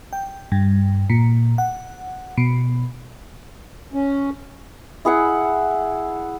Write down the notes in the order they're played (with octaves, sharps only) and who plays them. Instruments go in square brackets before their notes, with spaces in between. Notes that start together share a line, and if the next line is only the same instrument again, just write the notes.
[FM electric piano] G5
G2
A#2
F#5
B2
[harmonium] C#4
[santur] E4 G#4 E5 F#5